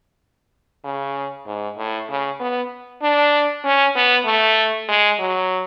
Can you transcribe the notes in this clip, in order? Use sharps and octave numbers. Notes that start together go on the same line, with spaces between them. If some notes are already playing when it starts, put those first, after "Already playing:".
C#3
G#2
A2
C#3
B3
D4
C#4
B3
A3
G#3
F#3